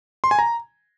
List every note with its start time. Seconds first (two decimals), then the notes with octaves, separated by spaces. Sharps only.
0.24 C6
0.31 G#5
0.39 A#5